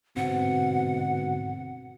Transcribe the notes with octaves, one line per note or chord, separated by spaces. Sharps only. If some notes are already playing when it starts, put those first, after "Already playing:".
G#2 B2 D3 C4 F#5